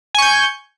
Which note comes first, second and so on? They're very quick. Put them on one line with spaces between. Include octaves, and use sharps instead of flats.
G#5 C#6 G6